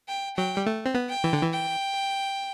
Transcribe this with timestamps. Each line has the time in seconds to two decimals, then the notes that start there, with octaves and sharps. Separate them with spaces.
0.08 G5
0.37 F#3 G5
0.57 G3
0.66 A3
0.86 C4
0.94 B3
1.09 G5
1.24 E3
1.33 D3
1.43 E3
1.53 G5